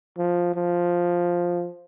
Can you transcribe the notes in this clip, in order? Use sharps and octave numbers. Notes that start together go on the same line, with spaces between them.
F3
F3